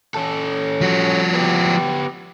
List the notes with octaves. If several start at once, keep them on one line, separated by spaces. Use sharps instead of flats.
C#4 A4
F3 F#4
B3 G4